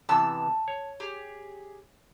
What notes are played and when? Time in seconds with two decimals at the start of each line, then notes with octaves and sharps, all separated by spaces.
0.09 C3 E3 B3 A5 E6
0.68 C#5
1.00 G4 G#4